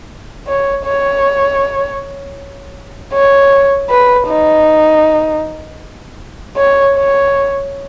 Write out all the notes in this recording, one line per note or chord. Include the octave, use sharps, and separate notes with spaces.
C#5
C#5
C#5
B4
D#4
C#5
C#5